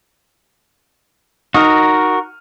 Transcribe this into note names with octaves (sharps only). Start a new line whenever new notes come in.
D#4 F#4 A#4 D#6 F6